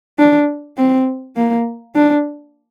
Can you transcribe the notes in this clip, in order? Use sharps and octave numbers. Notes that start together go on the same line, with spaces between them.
D4
C4
A#3
D4